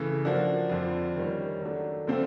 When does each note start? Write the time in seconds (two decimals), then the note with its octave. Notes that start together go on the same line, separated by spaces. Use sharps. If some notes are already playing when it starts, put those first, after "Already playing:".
Already playing: C#3 E3 A3
0.25 F3 A#3 D4 F#4
0.69 F2 D3 F3
1.16 D#3 G3 A#3 C#4
1.61 D#3 F#3 A3 D4
2.07 D3 F3 A3 C4 F4